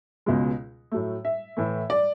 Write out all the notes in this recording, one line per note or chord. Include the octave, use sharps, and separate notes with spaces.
C#2 B2 G#3
A2 F#3 A3
E5
A2 E3 A3
D5